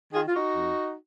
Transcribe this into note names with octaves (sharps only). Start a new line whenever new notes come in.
D#3 F4 G#4
F4
D#4 F#4
F2